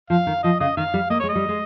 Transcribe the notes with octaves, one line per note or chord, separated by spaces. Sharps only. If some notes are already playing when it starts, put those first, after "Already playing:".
F3 F5
D#3
F3 D#5
C#3 D#5
D#3 F5
G3
A#3 D#5
G#3 C#5
D#5
G3
G#3